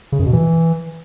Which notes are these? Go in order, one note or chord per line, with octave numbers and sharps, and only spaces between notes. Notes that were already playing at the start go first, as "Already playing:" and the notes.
C#3
F#2
B2
E3